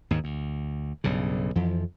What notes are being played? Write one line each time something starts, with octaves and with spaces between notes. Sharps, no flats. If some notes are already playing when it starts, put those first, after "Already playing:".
D#2 G#2
D2
B1 G2 C#3
F2 E3 F3